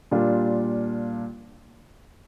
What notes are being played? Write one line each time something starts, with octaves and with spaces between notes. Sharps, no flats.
A#2 G3 D4 F4